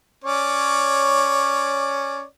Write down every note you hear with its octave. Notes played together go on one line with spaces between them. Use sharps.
C#4 C#5 D5